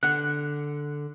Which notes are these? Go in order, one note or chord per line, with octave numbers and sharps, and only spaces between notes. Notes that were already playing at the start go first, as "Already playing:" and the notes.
D3 F#5 F#6